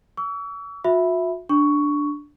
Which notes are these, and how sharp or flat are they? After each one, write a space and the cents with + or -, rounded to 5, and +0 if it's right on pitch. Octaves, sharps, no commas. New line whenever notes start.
C#6 +45 E6 +0
F#4 -45 E5 +0 B5 +0
D4 +0 C#6 +10